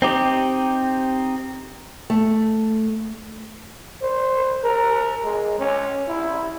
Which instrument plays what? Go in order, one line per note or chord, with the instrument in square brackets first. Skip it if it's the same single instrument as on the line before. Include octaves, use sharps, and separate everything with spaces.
[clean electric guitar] C4 D#4 G4
[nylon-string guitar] A3
[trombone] C5
A#4
G#3
C#4
E4